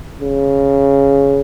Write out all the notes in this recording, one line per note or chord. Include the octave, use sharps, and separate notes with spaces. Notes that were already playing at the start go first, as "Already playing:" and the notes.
C#3